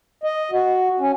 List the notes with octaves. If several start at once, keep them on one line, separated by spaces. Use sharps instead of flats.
D#5
F#4
C#4